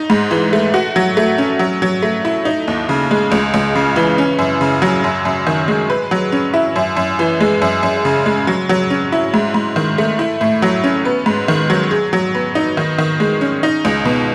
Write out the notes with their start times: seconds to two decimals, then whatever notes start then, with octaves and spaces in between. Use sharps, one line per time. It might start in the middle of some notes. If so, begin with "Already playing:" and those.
Already playing: D#4
0.10 G#2
0.31 E3
0.53 A3
0.74 F#4
0.96 F#3
1.17 A3
1.38 C#4
1.59 F#3
1.82 F#3
2.02 A3
2.25 E4
2.45 D#4
2.68 D#2
2.89 C#3
3.11 G#3
3.32 C#2
3.54 C#2
3.75 C#3
3.96 E3
4.18 C#4
4.39 F#2
4.61 C#3
4.82 F#3
5.04 F#2
5.25 F#2
5.47 D#3
5.68 G#3
5.90 B4
6.11 F#3
6.32 C#4
6.54 E4
6.76 F#2
6.97 F#2
7.19 E3
7.40 G#3
7.62 F#2
7.83 F#2
8.05 C#3
8.26 G#3
8.47 F#3
8.69 F#3
8.90 C#4
9.12 E4
9.34 G#2
9.54 G#2
9.76 D#3
9.98 A3
10.19 E4
10.41 A2
10.62 F#3
10.84 C#4
11.05 B3
11.26 G#2
11.48 D#3
11.70 F#3
11.91 G#4
12.13 F#3
12.35 B3
12.55 D#4
12.77 D#3
12.98 D#3
13.20 G#3
13.41 C#4
13.63 D#4
13.85 C#2
14.05 B2